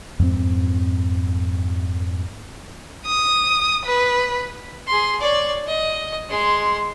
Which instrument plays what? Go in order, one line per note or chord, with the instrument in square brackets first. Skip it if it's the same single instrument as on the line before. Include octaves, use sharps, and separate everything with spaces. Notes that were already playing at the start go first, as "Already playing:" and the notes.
[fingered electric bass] F2 G#2 G#3 C4
[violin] D#6
B4
[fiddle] G#4 C6
C#5 D5
D#5
G#3 C6